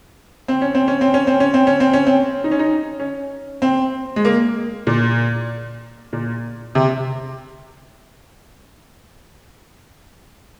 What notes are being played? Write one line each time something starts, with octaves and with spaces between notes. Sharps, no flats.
C4
C#4
C4
C#4
C4
C#4
C4
C#4
C4
C#4
C4
C#4
C4
D#4
C#4
D#4
C#4
C4
G#3
A#3
A#2
A#2
C3